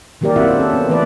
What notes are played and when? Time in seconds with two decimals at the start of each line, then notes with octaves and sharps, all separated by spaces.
0.21 D#3 F#3 A#3 G4 A#4 D5
0.36 C4 E4 F4 E5 F#5
0.57 C#4 A4
0.73 B3
0.89 E3 A3 C#4 B4 D5